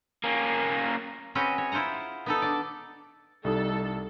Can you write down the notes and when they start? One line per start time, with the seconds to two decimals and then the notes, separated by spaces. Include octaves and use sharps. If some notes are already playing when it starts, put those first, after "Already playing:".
0.24 A#3 C#4
1.35 C4 C#4 F#4 G#4 B4 D#5
1.58 C#5
1.72 E4 F4 C5 F#5 A#5
2.26 B3 D#4 A4
2.42 D4 D5
3.45 C2 G3 D#4 A4 D#6